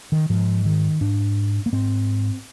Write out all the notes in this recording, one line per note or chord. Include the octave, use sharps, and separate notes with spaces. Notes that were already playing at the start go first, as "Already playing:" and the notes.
D#3
G#2 F3
D#3
G#2 D4
A#3
G#2 C4